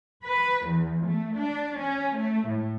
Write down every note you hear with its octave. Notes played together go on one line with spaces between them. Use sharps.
B4
E2
A3
D4
C#4
A3
A2